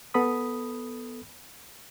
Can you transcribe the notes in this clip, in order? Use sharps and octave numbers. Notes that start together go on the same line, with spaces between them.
B3 A4 B5 D#6